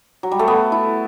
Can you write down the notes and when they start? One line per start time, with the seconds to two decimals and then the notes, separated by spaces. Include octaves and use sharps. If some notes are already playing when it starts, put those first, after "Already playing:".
0.23 F#3
0.31 G3
0.39 A3
0.48 B3
0.72 E4